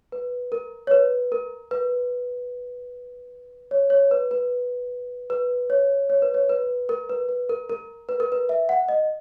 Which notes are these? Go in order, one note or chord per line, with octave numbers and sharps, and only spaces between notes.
B4
A#4
C#5
B4
A#4
B4
C#5
C#5
B4
B4
B4
C#5
C#5
B4
C#5
B4
A#4
B4
B4
A#4
A#4
B4
A#4
B4
E5
F#5
D#5